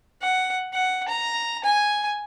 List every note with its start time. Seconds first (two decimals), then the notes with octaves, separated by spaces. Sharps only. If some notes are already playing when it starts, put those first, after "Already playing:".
0.22 F#5
0.73 F#5
1.08 A#5
1.64 G#5